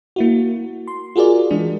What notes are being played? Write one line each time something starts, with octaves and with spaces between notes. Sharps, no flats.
A#3 E4 F#4
C6
F4 F#4 G#4 A#4 D5
E3 G#3 D4